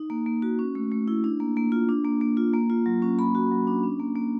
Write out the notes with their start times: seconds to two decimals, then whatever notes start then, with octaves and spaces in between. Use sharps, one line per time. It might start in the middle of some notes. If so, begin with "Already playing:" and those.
Already playing: D#4
0.10 A#3
0.26 A#3
0.42 F#4
0.59 C#4
0.75 A3
0.91 A3
1.08 E4
1.24 D4
1.40 A#3
1.57 A#3
1.72 F4
1.89 D4
2.05 A#3
2.21 A#3
2.37 F4
2.53 A#3
2.70 F4
2.86 F#3
3.02 C#4
3.19 A#3 B5
3.35 F#4
3.51 F#3
3.67 D4
3.83 C#4
4.00 A#3
4.16 A#3